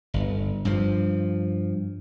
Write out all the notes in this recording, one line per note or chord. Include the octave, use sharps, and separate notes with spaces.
G1
G2 F3